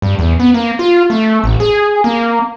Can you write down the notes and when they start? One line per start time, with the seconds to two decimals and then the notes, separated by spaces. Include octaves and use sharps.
0.02 G2
0.19 E2
0.40 B3
0.54 A#3
0.79 F4
1.10 A3
1.44 A1
1.60 G#4
2.04 A#3